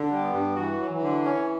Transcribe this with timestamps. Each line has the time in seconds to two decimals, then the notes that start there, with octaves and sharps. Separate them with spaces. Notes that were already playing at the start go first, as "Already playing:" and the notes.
Already playing: D3
0.10 G3
0.21 B3
0.32 G2
0.56 E3 F#4
0.79 F#3
0.90 E3
1.02 D3
1.24 C#4